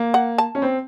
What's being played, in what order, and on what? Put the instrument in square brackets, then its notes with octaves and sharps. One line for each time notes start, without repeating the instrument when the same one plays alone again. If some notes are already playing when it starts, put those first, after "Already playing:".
Already playing: [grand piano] A#3
[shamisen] F#5
A5
[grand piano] C#4
C4